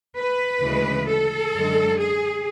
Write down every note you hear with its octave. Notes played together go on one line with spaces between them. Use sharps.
B4
D2 C#3 E3 G#3
A4
F#2 D3 G#3
G#4